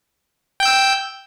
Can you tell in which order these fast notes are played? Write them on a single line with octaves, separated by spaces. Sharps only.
G5 G6 E6